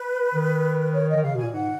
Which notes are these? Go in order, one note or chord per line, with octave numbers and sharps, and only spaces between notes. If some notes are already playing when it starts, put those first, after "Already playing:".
Already playing: B4
D#3
C#5
D#5
D#3
C#3 F5
B2 G#5
A#2
G#2 F#5